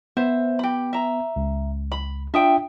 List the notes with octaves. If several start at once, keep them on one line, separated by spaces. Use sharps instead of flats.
B3 C5 E5
G4 B5
E5 A#5
C#2
B5
D4 F4 E5 G5 D#6